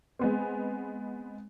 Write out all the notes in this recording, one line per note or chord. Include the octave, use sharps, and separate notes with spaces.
G#3 B3 C4